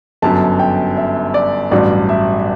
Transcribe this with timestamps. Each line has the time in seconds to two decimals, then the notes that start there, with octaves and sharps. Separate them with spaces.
0.22 G1 F#2 F#3 A5
0.59 G5
0.97 E5
1.34 D5
1.71 A1 G2 F#3 D5
2.09 E5